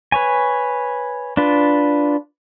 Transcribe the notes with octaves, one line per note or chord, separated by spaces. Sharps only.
B4 C#5 G#5
D4 F4 B4